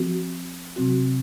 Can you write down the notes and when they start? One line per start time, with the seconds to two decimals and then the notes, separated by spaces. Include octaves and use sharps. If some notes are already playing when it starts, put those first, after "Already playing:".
Already playing: F3 C4 F#4
0.76 C3 F#3 C4 F#4